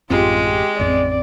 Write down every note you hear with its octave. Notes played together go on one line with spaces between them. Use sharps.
A1 F#2 G#3 C4 F4 G4
G4
A1 F2 C4 D5